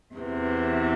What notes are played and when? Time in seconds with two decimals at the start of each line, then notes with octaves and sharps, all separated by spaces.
0.16 E2 C3 E3